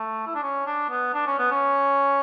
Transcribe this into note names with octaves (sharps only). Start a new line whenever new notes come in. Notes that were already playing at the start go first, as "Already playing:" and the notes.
Already playing: A3
E4
D4
C#4
D4
B3
D4
C#4
B3
C#4